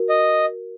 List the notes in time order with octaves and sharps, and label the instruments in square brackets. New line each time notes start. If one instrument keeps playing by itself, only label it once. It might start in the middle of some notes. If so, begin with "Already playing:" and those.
Already playing: [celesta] F#4 A#4
[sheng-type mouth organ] D#5